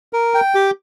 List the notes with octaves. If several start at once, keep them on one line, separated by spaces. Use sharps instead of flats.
A#4
G5
G4